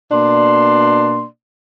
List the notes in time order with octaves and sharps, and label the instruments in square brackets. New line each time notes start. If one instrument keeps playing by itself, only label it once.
[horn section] B2 A#3 D4 D5 C6